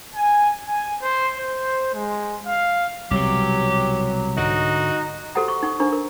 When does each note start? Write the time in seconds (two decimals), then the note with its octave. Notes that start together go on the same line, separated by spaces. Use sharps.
0.15 G#5
0.67 G#5
1.02 C5
1.37 C5
1.95 G#3
2.47 F5
3.11 C2 B2 F#3 G4
4.37 G#2 D3 D#4 F#4
5.35 F#4 G4 A4 C5 F#5 A#5
5.48 C#6
5.63 D#4 F#5 C#6
5.80 D4 A#4 C5 A#5 C#6
5.93 A#4